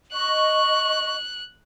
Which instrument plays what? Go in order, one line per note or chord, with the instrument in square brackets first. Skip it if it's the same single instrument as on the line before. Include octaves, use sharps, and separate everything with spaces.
[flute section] D#5 C#6 [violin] F#6